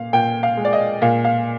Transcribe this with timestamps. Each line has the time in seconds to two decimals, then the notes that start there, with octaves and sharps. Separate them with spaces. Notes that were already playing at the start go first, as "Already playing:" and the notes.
Already playing: A#2 F5
0.13 A#2 G5
0.43 F5
0.57 G#3
0.65 D5
0.73 D#5
1.02 A#2 F5
1.25 F5